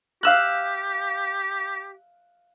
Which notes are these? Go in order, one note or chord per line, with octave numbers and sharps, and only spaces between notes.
G4 F5 E6 F#6